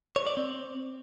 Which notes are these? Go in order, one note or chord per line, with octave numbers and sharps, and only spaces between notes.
C#5
D5
C4